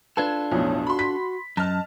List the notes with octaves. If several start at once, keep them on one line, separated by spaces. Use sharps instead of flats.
D4 F4 A4 B4 G#6
B1 F2 A2 C#5
F#4 B5 C6
B6
F#2 D#5 A5 F6